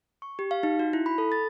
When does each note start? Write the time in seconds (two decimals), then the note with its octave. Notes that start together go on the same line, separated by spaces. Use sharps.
0.22 C#6
0.39 G4
0.51 F5
0.63 D#4
0.79 F#4
0.93 E4
1.06 B5
1.18 A4
1.32 A6